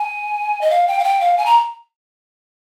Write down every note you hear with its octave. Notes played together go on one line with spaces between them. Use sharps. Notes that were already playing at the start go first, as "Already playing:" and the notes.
Already playing: G#5
D#5
F5
G5
F5
G5
F5
G#5
A#5